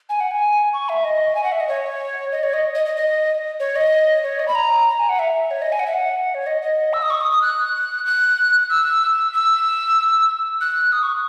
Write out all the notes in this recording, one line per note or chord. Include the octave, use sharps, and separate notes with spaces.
G#5
F#5
G#5
C#6
E5
D#5
G#5
F#5
E5
D#5
C#5
D#5
C#5
D#5
D#5
D#5
D#5
C#5
D#5
C#5
D#5
B5
A#5
A#5
G#5
F#5
E5
C#5
D#5
G#5
F#5
E5
F#5
C#5
D#5
D#5
E6
D#6
C#6
D#6
D#6
F#6
F#6
E6
E6
F#6
D#6
C#6